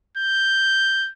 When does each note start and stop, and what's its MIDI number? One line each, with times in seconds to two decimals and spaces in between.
0.17 1.10 91